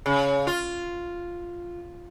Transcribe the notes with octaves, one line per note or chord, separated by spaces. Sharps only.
C#3
F4